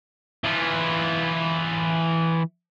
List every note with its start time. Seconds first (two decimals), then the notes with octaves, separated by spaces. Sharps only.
0.44 E3 F4